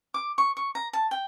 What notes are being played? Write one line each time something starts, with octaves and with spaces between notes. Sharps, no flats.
D6
C#6
C#6
A#5
A5
G5